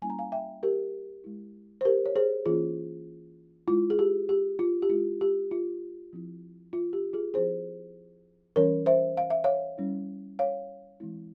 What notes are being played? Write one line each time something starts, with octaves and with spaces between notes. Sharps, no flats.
G3 A#3 C#4 E4 G#5
A#5
F5 G#5
E5 G5
G4 A#4
G#3 E4
C5
G4 A#4
C#5
G#4 C5
E3 A#3 C#4 E4 F4 G#4
G#3 E4 F4
G#4
G4
G4
F4
G4
G#3 E4 F4
G4
F4
F3 C4 E4
F4
G4
F4 G#4
F3 C4 E4 G#4 C5
E3 G3 C#4 A#4 C#5
C5 E5
F5
E5
C#5 F5
G3 C#4 E4
C#5 F5
E3 G#3 C4 E4